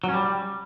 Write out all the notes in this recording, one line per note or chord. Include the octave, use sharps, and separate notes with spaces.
F#3
C#4
G3